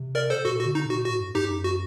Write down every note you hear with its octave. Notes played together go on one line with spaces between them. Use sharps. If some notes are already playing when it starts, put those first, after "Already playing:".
Already playing: C3
A#4 D5
A4 C5
A#2 F#4 A4
F#4
D3
D#4
A#2 F#4
A2 F#4
G2
G2 D#4 G4
F#2
F#4